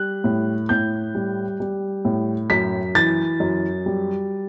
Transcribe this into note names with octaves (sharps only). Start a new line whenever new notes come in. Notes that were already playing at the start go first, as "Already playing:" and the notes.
Already playing: G3 F#6
A2
A2 G6
G3
G3
A2
F#2 B6
E3 A6
F#2
G3